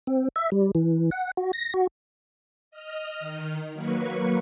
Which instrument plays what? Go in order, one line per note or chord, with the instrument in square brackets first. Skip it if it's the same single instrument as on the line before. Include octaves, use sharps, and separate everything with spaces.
[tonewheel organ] C4
E5
G3
E3
F#5
F#4
A#6
F#4
[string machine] D#5 F6
D#3
F#3 A#3 B4 C#6